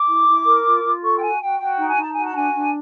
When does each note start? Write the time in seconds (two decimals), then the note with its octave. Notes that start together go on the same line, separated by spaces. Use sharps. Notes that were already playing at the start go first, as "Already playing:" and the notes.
Already playing: D6
0.08 E4
0.28 E4
0.46 A#4
0.65 F4
0.84 F4
1.03 A4 C#6
1.18 G5
1.21 F#4 G#5
1.40 F#4 G5
1.59 F#4 G5
1.78 D#4
1.88 G#5
1.97 D#4 A5
2.13 F#4 G#5
2.25 A5
2.35 D4 G#5
2.53 D4